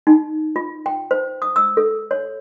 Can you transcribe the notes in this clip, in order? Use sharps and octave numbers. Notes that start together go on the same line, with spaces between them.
D#4
F4
G5
C5
D#6
E6
A4
C#5